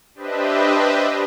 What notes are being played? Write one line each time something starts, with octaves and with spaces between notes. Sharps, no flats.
D4 G4 B4 C5 D#5 E5